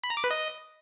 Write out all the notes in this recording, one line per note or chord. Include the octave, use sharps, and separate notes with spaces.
B5
A#5
D6
B4
D#5